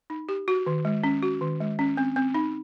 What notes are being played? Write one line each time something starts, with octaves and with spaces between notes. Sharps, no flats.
D#4
G4
F#4
D#3
G#3
C#4
F#4
D#3
G#3
C#4
C4
C4
D#4